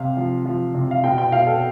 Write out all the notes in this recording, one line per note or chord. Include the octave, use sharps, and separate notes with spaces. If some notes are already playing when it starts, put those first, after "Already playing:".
Already playing: C3 F5
F3
F3
C3
F5
B2 G5
G5
B2 F5
A4